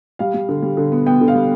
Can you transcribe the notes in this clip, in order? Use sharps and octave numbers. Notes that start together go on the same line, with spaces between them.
G3 F5
G3
D3
G3
D3
B3
B3 G5
D3
F5
G3